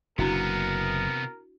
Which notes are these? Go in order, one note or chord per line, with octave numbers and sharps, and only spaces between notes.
F#1 C3 B3 D4 E4 F#4 A#4